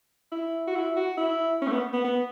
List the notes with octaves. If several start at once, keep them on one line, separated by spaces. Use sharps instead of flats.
E4
F#4
E4
F#4
E4
C#4
A3
B3
B3
B3